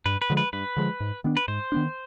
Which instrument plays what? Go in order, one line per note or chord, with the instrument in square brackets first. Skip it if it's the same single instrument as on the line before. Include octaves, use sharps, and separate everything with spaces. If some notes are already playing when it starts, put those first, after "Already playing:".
[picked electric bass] G2 [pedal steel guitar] B4
[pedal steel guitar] B4
[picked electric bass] D3 F3 G#3
[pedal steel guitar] B4
[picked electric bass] G2 [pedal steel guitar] B4
[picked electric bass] D3 F3 G#3
G#2
D#3 B3 D4
[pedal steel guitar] B4
[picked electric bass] G#2 [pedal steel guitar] C5
[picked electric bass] D#3 B3 D4